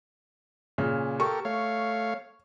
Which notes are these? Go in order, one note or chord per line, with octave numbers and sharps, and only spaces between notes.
A#2 C#3 C#4
G4 A4 A#4 C#6
A3 C#5 F5